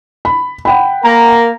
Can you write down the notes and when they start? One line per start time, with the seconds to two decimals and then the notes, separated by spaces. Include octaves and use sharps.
0.25 B5
0.65 F#5 G5 B5
1.04 A#3 A#4 A#5